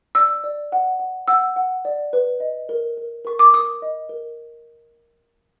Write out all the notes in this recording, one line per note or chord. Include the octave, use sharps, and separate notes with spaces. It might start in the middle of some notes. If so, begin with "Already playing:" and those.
D5 E6
D5
F#5
F#5
F#5 E6
F#5
D5
B4
D#5
A#4
A#4
A#4 C#6
D6
A#4 D#6
D#5
A#4